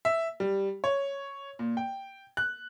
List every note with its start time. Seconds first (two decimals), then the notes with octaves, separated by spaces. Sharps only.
0.05 E5
0.40 G3
0.84 C#5
1.59 A#2
1.77 G5
2.37 F#6